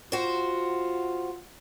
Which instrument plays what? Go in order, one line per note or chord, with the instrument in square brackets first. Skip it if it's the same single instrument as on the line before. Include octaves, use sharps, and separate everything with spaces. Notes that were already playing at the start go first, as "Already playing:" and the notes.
[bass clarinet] F4 [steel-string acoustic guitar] F#4 C5